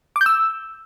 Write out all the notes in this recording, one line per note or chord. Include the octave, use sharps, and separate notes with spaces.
D6
G6
E6